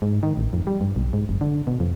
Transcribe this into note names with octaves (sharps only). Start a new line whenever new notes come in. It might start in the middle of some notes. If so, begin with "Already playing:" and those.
G#2
D#3
A1
F2
G3
G2
B1
G#2
F#1
D3
B2
F2